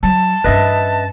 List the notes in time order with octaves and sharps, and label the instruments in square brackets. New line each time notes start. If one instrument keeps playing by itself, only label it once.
[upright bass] F#3 [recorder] A5
[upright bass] G2 C#4 [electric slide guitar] B4 D#5 E5